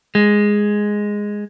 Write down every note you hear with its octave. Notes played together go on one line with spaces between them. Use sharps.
G#3